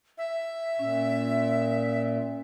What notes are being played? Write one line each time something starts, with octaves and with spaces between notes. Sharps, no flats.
E5
A#2 C#4